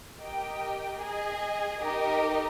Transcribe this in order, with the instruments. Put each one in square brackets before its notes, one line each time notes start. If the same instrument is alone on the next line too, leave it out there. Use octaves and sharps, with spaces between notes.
[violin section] G4 A#4 D#5 G5
G#4 D#5 G#5
D#4 G4 A#4 D#5